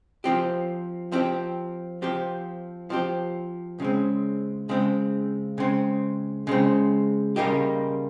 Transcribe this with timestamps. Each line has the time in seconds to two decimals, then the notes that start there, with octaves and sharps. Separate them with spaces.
0.24 F3 C4 G4
1.12 F3 C4 G4
2.02 F3 C4 G4
2.90 F3 C4 G4
3.80 C#3 G#3 C4
4.69 C#3 G#3 C4
5.58 C#3 G#3 C4
6.47 C#3 G#3 C4
7.36 C#3 G3 A#3 D#4 G4